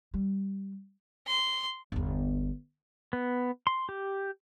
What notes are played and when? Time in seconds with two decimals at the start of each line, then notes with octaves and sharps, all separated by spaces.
0.14 G3
1.28 C6
1.92 G1 E2
3.13 B3
3.67 C6
3.89 G4